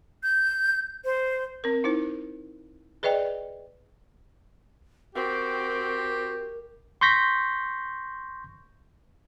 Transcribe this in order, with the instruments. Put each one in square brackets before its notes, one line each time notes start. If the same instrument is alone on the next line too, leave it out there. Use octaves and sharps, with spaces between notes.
[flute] G6
C5
[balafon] C4 A#4
D#4 E4 C5
G#4 B4 D5 D#5 G5
[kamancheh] C4 [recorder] F#4 [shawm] G4 [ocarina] A#4
[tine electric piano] C6 C#6 G6 A#6 B6